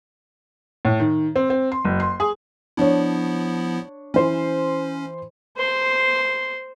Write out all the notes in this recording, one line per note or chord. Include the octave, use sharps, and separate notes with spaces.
A2
D#3
C4
C4
C6
F#1
C6
G#4
F3 B3 D4 E4 C#5
E3 C#4 C5
C5 C6